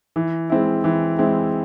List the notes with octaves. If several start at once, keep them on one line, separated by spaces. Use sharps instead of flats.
E3
G#3 C4 E4
E3
G#3 C4 E4